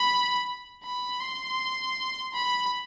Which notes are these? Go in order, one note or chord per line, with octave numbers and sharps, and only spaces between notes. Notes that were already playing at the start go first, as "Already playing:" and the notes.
Already playing: B5
B5
C6
B5